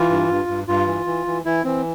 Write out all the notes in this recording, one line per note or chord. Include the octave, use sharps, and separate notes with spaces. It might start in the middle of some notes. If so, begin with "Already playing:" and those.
Already playing: E3 F4
G2
G2
G2
G2 F4
E3
E3
E3
E3 E4
E3 C4